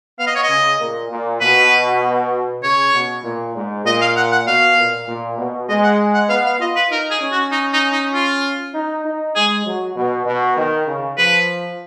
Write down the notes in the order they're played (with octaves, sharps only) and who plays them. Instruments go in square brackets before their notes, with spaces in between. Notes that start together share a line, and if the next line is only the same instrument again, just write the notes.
[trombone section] B3 [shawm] F5
[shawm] D#5
C#5
D#5
[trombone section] C#3
A#2
A#2
[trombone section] B2 [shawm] B4
[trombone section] C#3 [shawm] C#5
[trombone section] B2
A#2
G#2
[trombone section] A#2 [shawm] D#5
[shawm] F5
F#5
F#5
[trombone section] B2 [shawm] F5
[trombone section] A#2
A#2
B2
[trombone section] G#3 [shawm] D#5
[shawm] F#5
F#5
[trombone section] B3 [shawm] F5
[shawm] F5
[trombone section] F4 [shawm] D#5
[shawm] B4
[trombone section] D#4 [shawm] A#4
[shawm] G#4
[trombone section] C#4
[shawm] F#4
D#4
D#4
D#4
F4
[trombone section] D#4
D#4
[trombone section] G#3 [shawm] G#4
[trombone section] F#3
B2
B2
D#3
C#3
[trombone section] F3 [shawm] B4